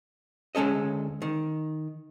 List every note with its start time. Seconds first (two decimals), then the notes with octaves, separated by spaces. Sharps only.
0.55 D2 G#3 C#4 A4 D#5
1.22 D#3